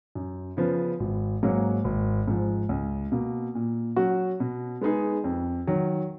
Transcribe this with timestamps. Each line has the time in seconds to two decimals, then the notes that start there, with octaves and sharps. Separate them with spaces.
0.15 F#2
0.57 C#3 F3 B3
1.00 G#1
1.43 G#2 F#3 A#3
1.84 G#1
2.28 G#2 F3
2.69 C#2
3.12 B2 A#3
3.55 A#2
3.96 F#3 C#4 F#4
4.40 B2
4.81 G#3 B3 D#4 G#4
5.24 F2
5.67 D#3 F#3